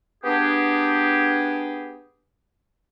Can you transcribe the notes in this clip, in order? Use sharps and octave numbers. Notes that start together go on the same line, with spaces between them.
B3 D4 G4 G#4